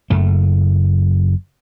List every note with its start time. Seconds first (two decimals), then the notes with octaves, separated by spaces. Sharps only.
0.10 F#1 F#2 A3